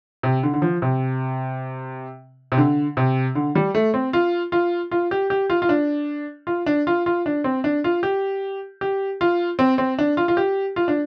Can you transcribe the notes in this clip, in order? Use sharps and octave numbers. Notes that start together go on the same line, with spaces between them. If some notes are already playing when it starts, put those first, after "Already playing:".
C3
D3
D3
F3
C3
C3
D3
C3
D3
G3
A3
C4
F4
F4
F4
G4
G4
F4
F4
D4
F4
D4
F4
F4
D4
C4
D4
F4
G4
G4
F4
C4
C4
D4
F4
F4
G4
F4
D4